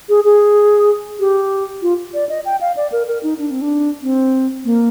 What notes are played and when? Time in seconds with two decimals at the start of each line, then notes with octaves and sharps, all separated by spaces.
0.09 G#4
0.24 G#4
1.20 G4
1.82 F4
2.14 D5
2.29 D#5
2.45 G5
2.61 F5
2.76 D5
2.92 A#4
3.08 A#4
3.23 D#4
3.39 D4
3.50 C4
3.61 D4
4.02 C4
4.65 A#3